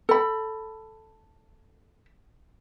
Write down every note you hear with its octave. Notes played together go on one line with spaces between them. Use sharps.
A4 B5